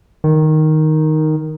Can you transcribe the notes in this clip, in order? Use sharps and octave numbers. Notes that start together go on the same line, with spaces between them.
D#3